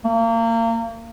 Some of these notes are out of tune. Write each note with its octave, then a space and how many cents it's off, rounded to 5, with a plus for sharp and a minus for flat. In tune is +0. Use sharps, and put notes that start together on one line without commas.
A#3 -30